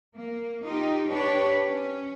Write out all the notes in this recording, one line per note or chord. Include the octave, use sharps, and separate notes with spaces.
A#3
D#4 F4 G4
D4 G4 B4 C#5
C#4